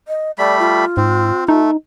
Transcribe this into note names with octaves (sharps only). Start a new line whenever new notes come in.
D#5
G3 A3 D5 B5
F4
G#2 C4
A3 D#4